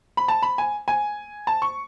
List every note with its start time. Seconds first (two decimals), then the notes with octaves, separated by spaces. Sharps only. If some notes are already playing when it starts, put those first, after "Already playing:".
0.17 B5
0.28 A5
0.42 B5
0.58 G#5
0.88 G#5
1.47 A5
1.62 C#6